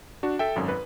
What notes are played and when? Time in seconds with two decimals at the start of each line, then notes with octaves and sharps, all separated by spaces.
0.23 D4 F#4
0.39 A4 E5 G5
0.56 G#1 F#2
0.68 B4